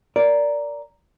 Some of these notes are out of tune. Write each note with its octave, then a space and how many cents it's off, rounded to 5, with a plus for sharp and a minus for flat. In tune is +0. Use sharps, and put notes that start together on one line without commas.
A#4 +0 D5 -10